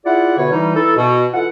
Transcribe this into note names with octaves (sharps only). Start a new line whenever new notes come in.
E4 F4 G#4 D5 F#5
B2 D3 B4 C#5
E3 G3 D#4
E3 D#4 E4 A4
B2
E3 F4 A4 F#5